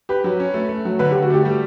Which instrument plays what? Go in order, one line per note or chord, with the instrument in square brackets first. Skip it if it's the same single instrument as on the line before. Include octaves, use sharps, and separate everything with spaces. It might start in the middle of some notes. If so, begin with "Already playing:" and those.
[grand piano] G4 [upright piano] B4
[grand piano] F#3
C#4
A3
A3
F#3
[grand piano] D3 [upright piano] B4
[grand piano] D3 [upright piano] G4
[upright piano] F#4
[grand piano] A3 [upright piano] G4
[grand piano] G3